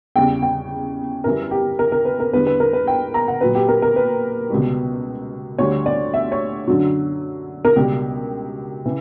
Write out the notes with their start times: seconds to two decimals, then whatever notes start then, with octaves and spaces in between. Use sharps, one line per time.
0.16 E2 C#3 G3 G5
0.42 G5
1.24 F#2 E3 G3 A#4
1.51 G4
1.79 A#4
1.92 A#4
2.05 B4
2.20 A#4
2.33 E2 D3 G3 B4
2.47 B4
2.60 A#4
2.73 B4
2.87 G5
3.14 A#5
3.28 F#5
3.41 A#2 F#3 B4
3.55 G4
3.68 A#4
3.82 A#4
3.96 B4
4.50 C#2 B2 G3
5.58 D2 D3 G3 C#5
5.86 D5
6.14 E5
6.32 C#5
6.67 F#2 D3 F#3
7.65 A#4
7.76 C#2 B2 G3 G4
8.86 C#3 E3